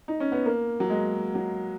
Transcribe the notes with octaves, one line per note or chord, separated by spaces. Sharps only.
D#4
C#4
B3
A#3
F#3
G#3
F#3